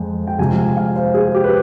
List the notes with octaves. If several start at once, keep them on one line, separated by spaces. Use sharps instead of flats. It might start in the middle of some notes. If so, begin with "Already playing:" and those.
Already playing: F2 G#3
G5
C3 F3 G#3 G#5
G#5
F5
C5
G#4
G4
B4